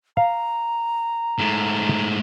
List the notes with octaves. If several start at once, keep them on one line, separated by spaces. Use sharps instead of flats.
F5 A#5
G#2 A3